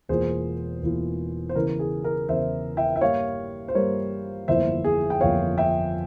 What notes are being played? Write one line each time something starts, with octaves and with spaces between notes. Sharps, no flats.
E1 E2 E3 A#3 F4 G#4 C5
E1 E2 E3 A#3 F4
C5
E2 C#3 E3 A#4
G#4
A#4
E2 C#3 E3 C5 E5
E5 G5
E5
G2 G3 A#3 C#5 F5
C5
G2 G3 A#3 A#4 C#5
G1 F2 E3 A#3 C5 E5
G#4
G5
G1 F2 E3 A#3 C#5 F5
E5 G5